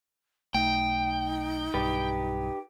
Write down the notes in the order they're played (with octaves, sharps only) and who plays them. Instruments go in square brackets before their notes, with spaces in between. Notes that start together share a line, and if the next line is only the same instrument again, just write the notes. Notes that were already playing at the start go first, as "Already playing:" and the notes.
[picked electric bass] B1 A3 [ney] D#4 [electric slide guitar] G5
[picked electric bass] B1 G2 [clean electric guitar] G4 B4